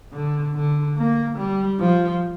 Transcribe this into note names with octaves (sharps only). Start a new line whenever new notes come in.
D3
D3
A#3
G3
F3